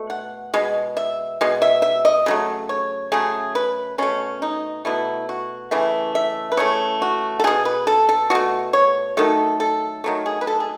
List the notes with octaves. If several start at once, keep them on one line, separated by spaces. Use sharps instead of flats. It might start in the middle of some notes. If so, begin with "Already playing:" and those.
Already playing: B2 A3
F#5
B2 G#3
E5
B2 G#3
E5
E5
D#5
C#3 F#3 A3
C#5
C#3 F#3 A3 G#4
B4
B2 A3 C#4
D#4
B2 A3 E4
F#4
C#3 E3 A3 E5
E5
B4
C#3 E3 A3 C#5
F#4
A4
B2 A3 G#4
B4
A4
A4
B2 A3 F#4
C#5
D#3 F#3 A3 A4
A4
D#3 F#3 A3
G#4
B4
A4
G#4